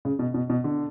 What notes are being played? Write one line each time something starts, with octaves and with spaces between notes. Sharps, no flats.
C#3
B2
B2
B2
D3